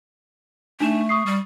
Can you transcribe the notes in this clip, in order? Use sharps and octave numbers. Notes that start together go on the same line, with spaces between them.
A3 D4 D#4 E7
C#6 D#6 C7
G3